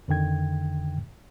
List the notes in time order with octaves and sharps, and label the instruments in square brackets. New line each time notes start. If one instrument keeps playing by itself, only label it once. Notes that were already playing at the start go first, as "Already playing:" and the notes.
[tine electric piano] F2 D3 D#3 G5 G#6